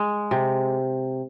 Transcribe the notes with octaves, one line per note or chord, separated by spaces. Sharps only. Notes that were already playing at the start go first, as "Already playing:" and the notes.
Already playing: G#3
C3